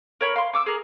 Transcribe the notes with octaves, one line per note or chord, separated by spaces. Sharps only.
A#4 C#5 B5
F5 C6
C#6 D6 E6
G#4 A#4